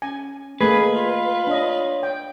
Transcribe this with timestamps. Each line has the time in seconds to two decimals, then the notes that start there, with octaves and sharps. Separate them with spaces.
0.02 C#4 G#5
0.61 A3 A#3 G#4 B4 D#5
0.95 F4
1.47 D4 C#5 D#5
2.03 G5